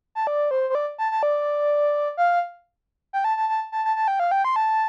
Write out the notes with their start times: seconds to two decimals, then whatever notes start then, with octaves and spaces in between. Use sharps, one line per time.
0.15 A5
0.27 D5
0.51 C5
0.70 C5
0.75 D5
0.98 A5
1.12 A5
1.23 D5
2.17 F5
3.13 G5
3.24 A5
3.37 A5
3.49 A5
3.72 A5
3.85 A5
3.96 A5
4.08 G5
4.20 F5
4.31 G5
4.45 C6
4.56 A5